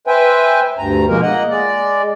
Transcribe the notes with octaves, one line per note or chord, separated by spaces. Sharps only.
B4 C5 E5 G5 G#5
D2 G2 A#5
B2 F3 G#3 A#3 A#4
A#3 D#5 F#5
G#3 D5